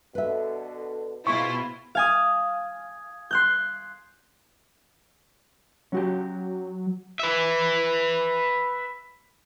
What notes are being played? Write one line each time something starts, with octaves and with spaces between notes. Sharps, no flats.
B2 D3 B4 E5
B2 G#3 C4 E4 F4 C#6
F5 G#5 D#6
C6 F#6 G6
F#3 C#4 F#4 G4
B4 E5